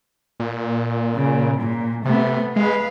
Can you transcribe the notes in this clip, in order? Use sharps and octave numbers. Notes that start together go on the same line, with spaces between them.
A#2
C#3
A#2
C3 A3 B3
G#3 B4 F5